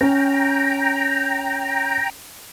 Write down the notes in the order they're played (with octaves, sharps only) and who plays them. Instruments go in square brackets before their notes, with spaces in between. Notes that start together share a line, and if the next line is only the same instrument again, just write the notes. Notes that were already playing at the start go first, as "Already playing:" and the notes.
[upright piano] C#4 [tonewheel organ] G5 A#5